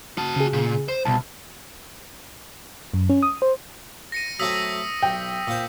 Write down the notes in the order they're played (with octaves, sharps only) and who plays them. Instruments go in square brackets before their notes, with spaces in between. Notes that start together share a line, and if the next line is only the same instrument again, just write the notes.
[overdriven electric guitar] F#4 A5
[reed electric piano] C#3 G#4
[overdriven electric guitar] A#2
C5
[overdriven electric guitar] C2 [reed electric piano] B2 A5
[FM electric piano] F#2
C#4
D#6
C5
[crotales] A#6 C#7 D#7
[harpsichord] F#3 A3 C4 [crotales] D#6 E6 B6
[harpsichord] B1 [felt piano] G5
[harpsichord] A#2 C5